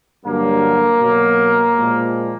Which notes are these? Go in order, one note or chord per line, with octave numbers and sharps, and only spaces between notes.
G2 D3 F#3 A#3
B2 F#3
A#2 F3 G#3